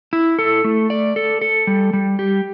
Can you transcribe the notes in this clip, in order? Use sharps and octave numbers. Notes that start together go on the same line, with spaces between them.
E4
A4
A3
D5
A4
A4
G3
G3
G4